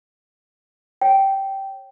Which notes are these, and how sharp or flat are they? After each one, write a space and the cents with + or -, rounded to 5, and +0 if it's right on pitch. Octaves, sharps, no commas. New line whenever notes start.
C#5 -15 G5 -10